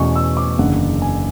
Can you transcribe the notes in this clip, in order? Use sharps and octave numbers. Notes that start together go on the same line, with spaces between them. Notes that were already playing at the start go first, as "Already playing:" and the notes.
Already playing: E2 B2 A3 C#4 C#6
E6
D6
F#1 E2 D3 F#5
G#5